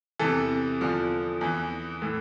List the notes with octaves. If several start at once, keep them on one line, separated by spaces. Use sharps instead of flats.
E2 C3 E3 A4
E2 D3 F3
E2 E3
A2 E3